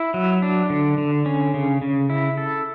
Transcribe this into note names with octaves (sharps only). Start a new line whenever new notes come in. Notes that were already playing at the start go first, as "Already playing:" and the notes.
Already playing: E4
F#3
D4
D3
D3
C#4
C#3
C#3
E4
A4